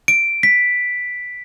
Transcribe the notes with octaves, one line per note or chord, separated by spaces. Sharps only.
D7
B6